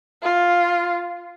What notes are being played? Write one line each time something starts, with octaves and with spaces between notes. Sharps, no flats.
F4